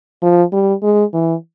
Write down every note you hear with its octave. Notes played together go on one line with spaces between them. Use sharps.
F3
G3
G#3
E3